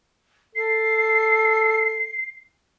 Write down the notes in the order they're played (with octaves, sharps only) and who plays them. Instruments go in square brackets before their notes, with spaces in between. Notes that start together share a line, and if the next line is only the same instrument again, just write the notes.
[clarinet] A4 [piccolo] C7